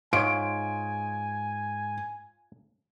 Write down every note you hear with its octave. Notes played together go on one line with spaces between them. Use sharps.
G#2 F4 C#5 G#5 D7